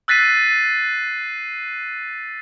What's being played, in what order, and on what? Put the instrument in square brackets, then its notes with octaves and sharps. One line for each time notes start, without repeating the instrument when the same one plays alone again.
[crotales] E6 F#6 A6 B6 C7 D#7